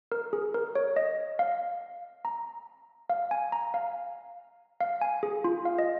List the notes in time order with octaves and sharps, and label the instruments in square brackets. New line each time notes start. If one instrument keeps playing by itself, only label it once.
[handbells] A#4
G#4
A#4
C#5
D#5
F5
A#5
F5
G#5
A#5
F5
F5
G#5
G#4
F4
F5
D#5